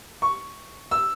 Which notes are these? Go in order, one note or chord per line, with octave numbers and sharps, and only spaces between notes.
C#6
E6